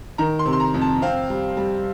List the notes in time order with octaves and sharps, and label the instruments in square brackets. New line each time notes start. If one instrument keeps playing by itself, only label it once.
[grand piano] D#3 A#5
C6
C3
C6
A#5
F2
A5
C4 F5
G3
G3